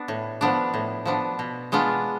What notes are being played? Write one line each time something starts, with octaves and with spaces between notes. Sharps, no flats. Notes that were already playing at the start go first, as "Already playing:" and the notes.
Already playing: B3 D4
A2
F3 B3 D4
A2
F3 B3 D4
B2
G#3 B3 D4 F4